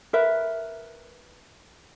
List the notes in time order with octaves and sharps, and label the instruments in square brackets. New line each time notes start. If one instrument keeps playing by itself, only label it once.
[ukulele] A#4 B4 E5